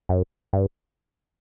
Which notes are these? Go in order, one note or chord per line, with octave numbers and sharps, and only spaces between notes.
F#2
G2